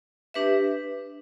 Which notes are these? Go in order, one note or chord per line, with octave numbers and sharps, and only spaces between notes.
D4 G4 B4 E5